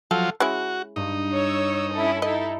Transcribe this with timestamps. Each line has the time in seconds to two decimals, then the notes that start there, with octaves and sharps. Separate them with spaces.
0.11 F3 F#3 F4 A4
0.40 G#3 C#4 E4 F#4
0.96 G2 D#4
1.34 C#5 E6
1.93 C#4 E4 A4
2.22 D#4 E4 A4 D#5